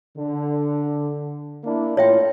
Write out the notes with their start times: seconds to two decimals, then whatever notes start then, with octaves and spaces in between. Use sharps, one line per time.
0.16 D3
1.64 A#3 D4 E4
1.97 A2 E4 F4 C#5 E5 G5